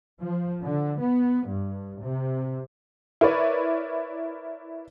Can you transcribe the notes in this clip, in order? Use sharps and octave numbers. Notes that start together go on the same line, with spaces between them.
F3
D3
B3
G2
C3
E4 A#4 B4 C#5 D5